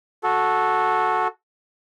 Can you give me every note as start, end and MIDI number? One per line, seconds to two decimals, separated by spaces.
0.23 1.28 66
0.23 1.28 69